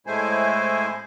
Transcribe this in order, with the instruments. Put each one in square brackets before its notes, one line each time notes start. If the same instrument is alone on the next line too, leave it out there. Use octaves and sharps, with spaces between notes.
[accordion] A2 G#3 A3 E4 C5 G#5